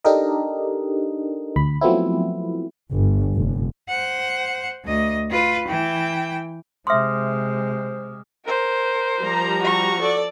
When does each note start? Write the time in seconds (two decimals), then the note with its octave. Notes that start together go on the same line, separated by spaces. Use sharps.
0.05 D4 D#4 G4 A4 A#4 D#5
1.56 D2 B5
1.81 F3 F#3 A3 B3 C4 E4
2.92 G1
3.34 F1
3.89 C5 F#5
4.85 D2 D#5
5.31 F4 B4
5.68 E3 G5
6.87 C3 G#3 C5 E5 C6 D6 D#6 F6
8.45 A#4 C5
9.21 F3 G3 A#5
9.60 F#4 C#6
10.00 A4 D5